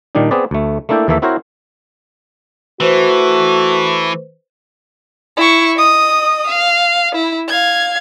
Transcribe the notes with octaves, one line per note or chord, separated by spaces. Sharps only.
A#2 D#3 G3 D4 D#4
B3 C4 G#4 B4 D5
D2 A3
A3 A#3 D4 E4 A4 G5
D#2 E3 A#3 A4 E5
C4 E4 F#4 A#4 C5 C#5
E3 A3 F#4 B4 C5
E4 C#6
D#5 D#6
F5
E4
F5 G#6